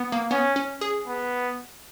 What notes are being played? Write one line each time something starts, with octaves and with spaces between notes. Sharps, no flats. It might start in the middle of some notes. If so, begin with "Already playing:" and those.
Already playing: B3
A#3
B3 C#4
C#4
G#4
B3